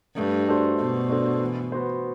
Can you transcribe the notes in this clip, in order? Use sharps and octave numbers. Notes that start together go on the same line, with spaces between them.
G2 A3
D4 F#4 A4 C5
B2 A3
D4 F#4 A4 C5
E3
B3 F#4 C5